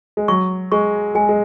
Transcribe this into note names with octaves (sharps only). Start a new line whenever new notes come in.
G#3
F#3 C#6
G#3 C#6
G#3 G#5
G#3